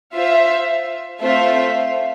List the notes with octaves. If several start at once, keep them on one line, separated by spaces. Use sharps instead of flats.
F4 C5 E5
A3 C4 F4 C5 E5